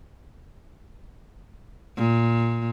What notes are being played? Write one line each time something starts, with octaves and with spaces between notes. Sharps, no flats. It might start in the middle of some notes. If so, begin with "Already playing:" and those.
A#2